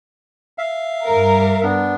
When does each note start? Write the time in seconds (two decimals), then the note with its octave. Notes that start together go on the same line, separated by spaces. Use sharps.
0.58 E5 F5
1.04 G2 A#4
1.63 B3 D4